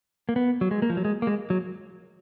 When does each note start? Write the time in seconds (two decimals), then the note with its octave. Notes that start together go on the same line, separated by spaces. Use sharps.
0.29 A#3
0.36 B3
0.61 F#3
0.71 G#3
0.82 A#3
0.90 F3
0.97 F#3
1.05 G#3
1.22 A#3
1.27 G#3
1.50 F#3